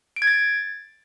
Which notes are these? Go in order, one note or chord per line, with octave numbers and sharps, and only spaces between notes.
D7
G#6
A6